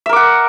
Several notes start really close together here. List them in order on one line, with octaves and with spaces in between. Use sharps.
E5 A#4 D6 F#5